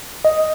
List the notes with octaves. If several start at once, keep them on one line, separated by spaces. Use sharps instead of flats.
D#5